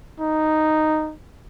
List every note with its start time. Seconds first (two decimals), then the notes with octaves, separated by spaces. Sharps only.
0.20 D#4